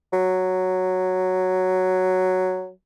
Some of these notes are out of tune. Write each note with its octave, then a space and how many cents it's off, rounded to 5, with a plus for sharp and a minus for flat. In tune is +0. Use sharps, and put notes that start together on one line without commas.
F#3 +0